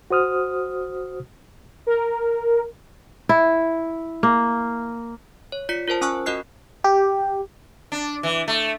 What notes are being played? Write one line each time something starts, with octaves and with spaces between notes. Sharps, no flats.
F#4 C5 D#6 F6
A#4
E4
A#3
C#5
F4 D5 B6 C#7
F4 A#4 C5 A5
C#4 G#5 C#6 E6 F#6
C#4 F#4 A#4 D#5 F#6 C7
G4
D4
E3
A3